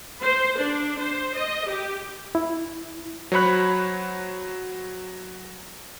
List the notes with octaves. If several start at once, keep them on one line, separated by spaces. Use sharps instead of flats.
C5
D4
C5
D#5
G4
E4
F#3 C5 C#5 B5 F#6